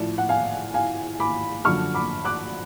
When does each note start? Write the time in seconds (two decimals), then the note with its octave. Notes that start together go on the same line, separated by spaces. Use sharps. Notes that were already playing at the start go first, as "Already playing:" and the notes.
Already playing: A2 F3 D5
0.18 F#5
0.29 F5 G#5
0.74 F5 G#5
1.20 B5 D6
1.65 F#2 D3 F3 C#6 F6
1.95 B5 D6
2.25 D6 F#6